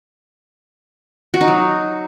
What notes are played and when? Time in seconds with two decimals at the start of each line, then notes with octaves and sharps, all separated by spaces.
1.34 F#4
1.41 D#4
1.48 F#3